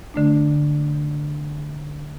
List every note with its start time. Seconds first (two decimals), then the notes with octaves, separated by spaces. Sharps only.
0.14 D3 A3 D4